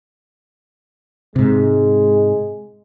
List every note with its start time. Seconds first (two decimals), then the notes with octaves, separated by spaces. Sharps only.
1.36 G#2 C3 G#3